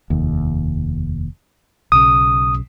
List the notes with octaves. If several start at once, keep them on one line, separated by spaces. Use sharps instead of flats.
F1 D#2
B1 C#3 D#6